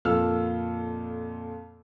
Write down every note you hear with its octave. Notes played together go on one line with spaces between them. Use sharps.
F2 A#2 A4 F5 E6 F6